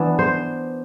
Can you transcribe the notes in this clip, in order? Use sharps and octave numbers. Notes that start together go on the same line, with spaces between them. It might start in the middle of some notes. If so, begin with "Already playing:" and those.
Already playing: E3 B3 D4
C5